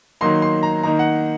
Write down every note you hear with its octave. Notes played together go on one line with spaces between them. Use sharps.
D#3 F#3 A#3 D#4 C6
C6
A#5
D#3 A#3 D#4 A#5
F#5